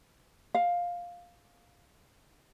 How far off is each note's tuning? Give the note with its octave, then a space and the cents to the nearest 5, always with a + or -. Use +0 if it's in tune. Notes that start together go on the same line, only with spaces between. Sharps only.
F5 +5